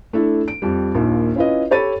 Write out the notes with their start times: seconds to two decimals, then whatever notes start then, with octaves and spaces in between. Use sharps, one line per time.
0.13 A3 D4 E4 A4
0.48 D7
0.62 F2 G3
0.94 A#1 D#2 A#2
1.36 C#4 E4 F4 B4 D#5
1.71 G4 A4 C#5 B5 A6 D#7